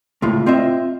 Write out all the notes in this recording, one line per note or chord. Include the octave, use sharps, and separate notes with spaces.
C#2 A2 F4
C4 F4 D#5 E5